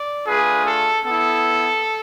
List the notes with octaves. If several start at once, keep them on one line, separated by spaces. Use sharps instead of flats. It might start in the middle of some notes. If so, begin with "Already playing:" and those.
Already playing: D5
A3 D4 F4 G#4 B4
A4
B3 E4 A4